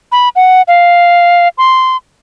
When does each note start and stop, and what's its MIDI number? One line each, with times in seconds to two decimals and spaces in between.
0.12 0.29 83
0.36 0.62 78
0.68 1.48 77
1.58 1.97 84